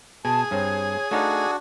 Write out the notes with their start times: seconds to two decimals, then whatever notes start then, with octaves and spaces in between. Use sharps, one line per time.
0.25 B2 G#4 A5
0.51 G2 C4 C#5
1.11 A3 D4 D#4 F#4 F5